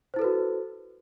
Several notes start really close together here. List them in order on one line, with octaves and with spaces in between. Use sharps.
C5 E4 A4 B4 F#4